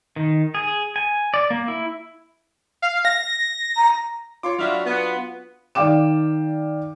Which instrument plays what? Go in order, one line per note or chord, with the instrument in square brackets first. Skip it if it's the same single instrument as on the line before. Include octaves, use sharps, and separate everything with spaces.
[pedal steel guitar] D#3
G#4
G#5
D5
A#3
E4
[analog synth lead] F5
A#6
[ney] A#5
[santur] F4 [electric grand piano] C#5 C6 D6
[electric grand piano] F#3 D4 F#4 [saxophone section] E4 E5 F5
[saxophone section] B3
[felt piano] D#3 D5 F5 G5 D6 E7